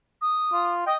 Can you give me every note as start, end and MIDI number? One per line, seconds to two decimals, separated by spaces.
0.21 0.72 87
0.52 0.85 65
0.86 0.97 75
0.86 0.93 79